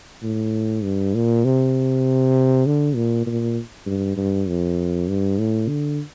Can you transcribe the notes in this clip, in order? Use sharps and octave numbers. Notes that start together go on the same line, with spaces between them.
A2
G2
A#2
C3
D3
A#2
A#2
G2
G2
F2
G2
A2
D3